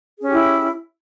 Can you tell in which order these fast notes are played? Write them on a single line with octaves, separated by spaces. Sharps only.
G#4 C#4 G4 E4